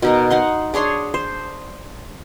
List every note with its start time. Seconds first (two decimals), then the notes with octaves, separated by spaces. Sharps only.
0.02 B2 D#4 A#4
0.30 D#4 F#5 C6
0.74 D4 G#4 C#5 C6
1.14 C5